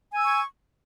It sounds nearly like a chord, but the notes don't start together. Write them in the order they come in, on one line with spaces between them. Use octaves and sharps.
G#5 E6 G#6 C#6